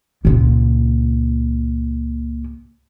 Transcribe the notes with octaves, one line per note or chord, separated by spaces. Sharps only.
C#2 A#2